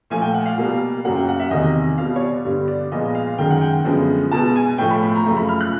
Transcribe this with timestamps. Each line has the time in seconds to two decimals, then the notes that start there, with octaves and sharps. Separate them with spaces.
0.10 A#2 F3 A3 G#5
0.22 G5
0.34 F#5
0.46 F5
0.58 B2 G3 A#3
1.04 F#2 C#3 F#3 A#3 F#5
1.15 G5
1.28 F#5
1.39 E5
1.51 E2 C3 D#3 D#5
1.98 B2 G3 B3 F5
2.16 C#5
2.21 D5
2.45 G2 D3 G3 B3
2.68 D5
2.91 A#2 F3 G#3 B3 D#5
3.15 F5
3.38 F#2 D#3 G#3 G5
3.50 F#5
3.61 G5
3.85 F#2 D3 F3 G#3 B3
4.32 B2 G#3 B3 A5
4.56 G#5
4.78 A2 F3 A3 G5
4.90 B5
5.02 B5
5.14 A#5
5.26 F#2 C#3 F3 A3 A#5
5.37 B5
5.49 F6
5.61 F#6